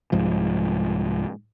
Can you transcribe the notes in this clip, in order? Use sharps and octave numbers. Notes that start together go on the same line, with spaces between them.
C2 G#2 F3